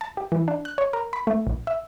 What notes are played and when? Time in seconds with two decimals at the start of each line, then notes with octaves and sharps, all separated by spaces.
0.01 A5
0.17 G4
0.32 E3
0.48 D4
0.65 F#6
0.78 C#5
0.93 A#4
1.13 B5
1.27 A3
1.47 A#1
1.67 E5